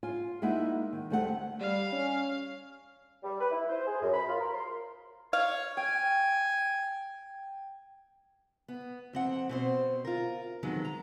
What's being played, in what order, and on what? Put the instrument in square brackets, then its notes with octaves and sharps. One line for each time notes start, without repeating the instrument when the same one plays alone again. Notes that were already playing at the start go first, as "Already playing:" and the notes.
[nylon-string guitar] F4 G#5
G#3 A#3 D#4 E4 E5 F#5
D#3
D2 G3 A3 C4 F#5
[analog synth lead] G3 [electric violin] F5
[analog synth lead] C#4
[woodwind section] G3
B4
E4
C5
G#4
F#2
B5
F4
A#4
C6
[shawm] C#5 [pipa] F5
[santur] G5 [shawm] G#5
[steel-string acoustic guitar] B3
F2 C4 F#5
B2 C4 C5
F4 A#4
F2 D#3 F#3 G#3 B3
A#5